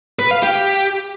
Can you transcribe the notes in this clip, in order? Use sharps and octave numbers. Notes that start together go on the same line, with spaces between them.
B4
F5
G4